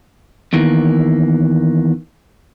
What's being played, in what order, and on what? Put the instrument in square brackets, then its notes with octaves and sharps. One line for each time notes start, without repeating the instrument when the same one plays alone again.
[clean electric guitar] E2 D#3 E3 A#3